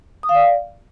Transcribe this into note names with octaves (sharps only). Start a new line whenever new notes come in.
D#6
F5
D5